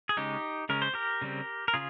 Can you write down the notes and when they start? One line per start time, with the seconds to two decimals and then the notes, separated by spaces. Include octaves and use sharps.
0.09 G#4
0.17 C#3 G#3 C#4 D#4 G4
0.69 C#3 G#3 C#4 A#4
0.82 C5
0.94 G4 A#4
1.22 C#3 G3 C4
1.68 A#4
1.74 C#3 F4 G#4